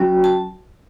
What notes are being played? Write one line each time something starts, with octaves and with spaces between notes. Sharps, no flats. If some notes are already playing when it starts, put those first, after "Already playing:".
Already playing: F#3 C#4 F#4 G5
A5